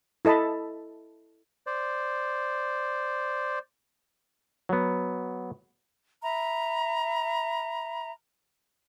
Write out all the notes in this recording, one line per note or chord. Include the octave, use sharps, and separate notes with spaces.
E4 A4 D#5 A5 B5
C5 D5
F#3 B3
E5 A#5 B5